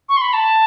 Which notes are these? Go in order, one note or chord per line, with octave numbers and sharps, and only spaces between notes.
C#6
C6
B5
A5